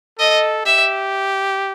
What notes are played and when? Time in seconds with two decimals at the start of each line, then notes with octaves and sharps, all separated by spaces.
0.19 A4 D#5
0.66 G4 E5